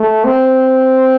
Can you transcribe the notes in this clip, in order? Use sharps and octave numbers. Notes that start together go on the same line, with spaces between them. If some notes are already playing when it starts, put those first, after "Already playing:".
Already playing: A3
C4